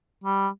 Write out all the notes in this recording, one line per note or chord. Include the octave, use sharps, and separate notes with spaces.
G3